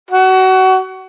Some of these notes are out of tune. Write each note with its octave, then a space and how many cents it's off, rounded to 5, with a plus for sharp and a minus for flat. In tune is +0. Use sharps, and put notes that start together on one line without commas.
F#4 +25